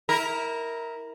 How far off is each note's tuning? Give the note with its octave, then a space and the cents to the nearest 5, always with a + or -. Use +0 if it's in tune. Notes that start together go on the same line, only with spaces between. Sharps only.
E4 -25 A#4 +0